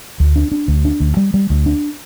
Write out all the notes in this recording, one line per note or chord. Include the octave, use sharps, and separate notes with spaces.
D2
D4
D4
D2
D4
D2
G3
G3
D2
D4